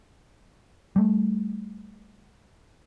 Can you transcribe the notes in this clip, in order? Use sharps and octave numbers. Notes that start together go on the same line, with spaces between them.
G3 A3